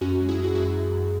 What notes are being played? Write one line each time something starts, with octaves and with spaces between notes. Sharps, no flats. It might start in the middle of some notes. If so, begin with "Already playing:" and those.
F#2 C#4 F#4
G#3
E4 G#4
G#3
F#4
F#2 E4 G#4
F#2
F#2